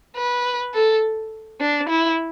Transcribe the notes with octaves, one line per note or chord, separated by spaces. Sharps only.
B4
A4
D4
E4